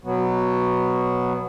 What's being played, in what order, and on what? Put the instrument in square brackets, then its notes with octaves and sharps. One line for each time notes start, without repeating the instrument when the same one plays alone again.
[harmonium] B2 F#3 B3